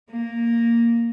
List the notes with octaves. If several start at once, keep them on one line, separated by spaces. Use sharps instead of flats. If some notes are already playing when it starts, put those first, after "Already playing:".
A#3